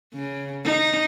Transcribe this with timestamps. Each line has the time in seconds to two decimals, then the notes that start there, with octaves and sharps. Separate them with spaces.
0.14 C#3
0.65 D#4